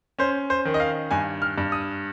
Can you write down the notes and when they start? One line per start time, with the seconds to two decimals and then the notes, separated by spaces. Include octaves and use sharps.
0.19 C#4 C5
0.50 C5
0.65 D#3
0.74 D#5
0.80 F5
1.11 G2 G#5
1.42 F6
1.58 G2
1.72 D#6